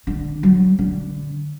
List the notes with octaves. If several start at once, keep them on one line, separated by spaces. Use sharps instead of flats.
D3
F#3
D3